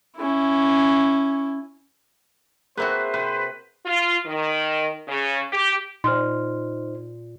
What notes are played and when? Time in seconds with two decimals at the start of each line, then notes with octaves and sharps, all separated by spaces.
0.17 C#4 E4
2.77 A#3 C4 F#4 G#4 B4 C5 E5
3.14 C3 B4
3.86 F4
4.26 D#3
5.08 C#3
5.53 G4
6.04 A#2 D#4 C5 C6 F6